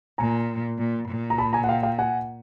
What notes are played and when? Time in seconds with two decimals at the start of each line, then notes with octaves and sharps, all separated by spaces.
0.18 A#2 G#5 A#5
0.78 A#2
1.08 A#2
1.30 A#5
1.38 A5 B5
1.53 G#5 A#5
1.64 F#5
1.69 F5 G5
1.83 F5 G5
1.99 F#5 G#5